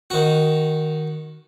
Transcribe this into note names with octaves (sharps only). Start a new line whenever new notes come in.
D#3 F#4